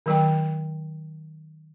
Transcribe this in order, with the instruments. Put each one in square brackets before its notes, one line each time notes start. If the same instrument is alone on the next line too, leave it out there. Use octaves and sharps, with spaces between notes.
[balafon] D#3 F#3 G5